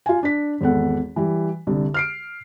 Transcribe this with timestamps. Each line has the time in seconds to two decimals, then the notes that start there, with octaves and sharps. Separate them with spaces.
0.06 F4 G#5
0.23 D4 B6
0.61 G#1 E2 A4 F#5
1.16 E3 G3
1.67 C2 D3
1.94 F6 C7 D7